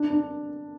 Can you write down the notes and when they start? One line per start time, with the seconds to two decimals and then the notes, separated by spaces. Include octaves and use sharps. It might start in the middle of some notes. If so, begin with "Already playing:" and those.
Already playing: D4
0.10 D4